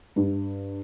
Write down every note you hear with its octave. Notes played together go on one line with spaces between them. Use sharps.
G2